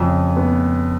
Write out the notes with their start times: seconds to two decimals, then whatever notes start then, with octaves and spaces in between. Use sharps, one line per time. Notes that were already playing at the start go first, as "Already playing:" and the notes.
Already playing: F2 C#3
0.37 B3